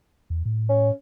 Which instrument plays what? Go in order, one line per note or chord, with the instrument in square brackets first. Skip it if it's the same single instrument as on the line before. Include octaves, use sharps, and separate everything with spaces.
[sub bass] E2
A2
[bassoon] C#4